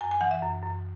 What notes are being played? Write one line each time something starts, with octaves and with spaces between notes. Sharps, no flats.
F#2 G#5
G#5
E3 F#5
E5
F#2
F#2